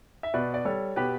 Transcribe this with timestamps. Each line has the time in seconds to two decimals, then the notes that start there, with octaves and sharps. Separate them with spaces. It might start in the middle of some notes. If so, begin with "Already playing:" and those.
0.23 E5
0.34 B2 B4 D5
0.54 D5
0.65 G3 A4 C#5
0.96 B2 G4 B4